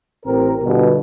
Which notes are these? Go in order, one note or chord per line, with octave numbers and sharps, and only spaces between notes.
A1 C4 A#4
G1 G2 B2